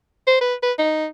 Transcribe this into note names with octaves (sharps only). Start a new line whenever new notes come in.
C5
B4
B4
D#4